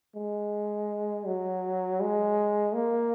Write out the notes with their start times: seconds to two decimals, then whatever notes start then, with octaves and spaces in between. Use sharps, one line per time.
0.15 G#3
1.26 F#3
2.01 G#3
2.74 A#3